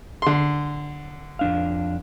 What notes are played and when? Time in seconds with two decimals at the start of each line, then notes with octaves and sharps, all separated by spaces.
0.22 D3 C6
1.39 F2 D4 F5